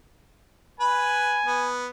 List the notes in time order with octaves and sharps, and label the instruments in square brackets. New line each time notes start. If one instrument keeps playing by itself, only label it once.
[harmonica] B4 B5 [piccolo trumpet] G#5
[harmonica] B3